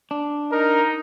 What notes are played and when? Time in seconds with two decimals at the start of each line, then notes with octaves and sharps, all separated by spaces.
0.11 D4
0.52 D#4 A#4